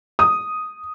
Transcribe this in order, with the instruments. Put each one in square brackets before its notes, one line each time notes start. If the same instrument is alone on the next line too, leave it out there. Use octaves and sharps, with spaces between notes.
[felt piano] D#6